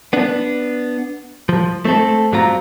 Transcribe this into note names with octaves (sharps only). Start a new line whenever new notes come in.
B3 D4
F3
A3 C4 A4
G2 F#3 C4 F4 A#5